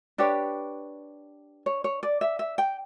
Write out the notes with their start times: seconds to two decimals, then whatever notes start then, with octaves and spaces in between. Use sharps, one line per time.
0.18 D4 G4 B4 C#5
1.66 C#5
1.84 C#5
2.03 D5
2.21 E5
2.39 E5
2.58 G5